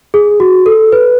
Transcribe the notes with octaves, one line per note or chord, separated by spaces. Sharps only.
G#4
F#4
A4
B4